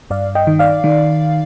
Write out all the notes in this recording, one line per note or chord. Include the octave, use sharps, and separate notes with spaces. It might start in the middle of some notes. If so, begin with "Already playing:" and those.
G2 D5 F5
D#5 G5
D#3
D5 F5
D#3